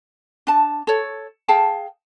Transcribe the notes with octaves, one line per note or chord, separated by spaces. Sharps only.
D4 A5
A4 C#5
G#4 F5 G5 A5